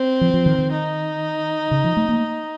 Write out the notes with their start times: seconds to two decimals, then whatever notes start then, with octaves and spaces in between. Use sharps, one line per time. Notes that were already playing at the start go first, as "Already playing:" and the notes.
Already playing: C4
0.21 F3
0.34 F3
0.46 D#3
0.59 D#3
0.71 D#4
1.71 C#3
1.84 F3
1.97 A3
2.09 A#3